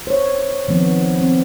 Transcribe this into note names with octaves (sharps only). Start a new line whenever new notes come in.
C5 C#5
D#3 F3 B3 C4
C4